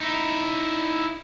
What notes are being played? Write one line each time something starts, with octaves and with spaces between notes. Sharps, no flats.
D#4 E4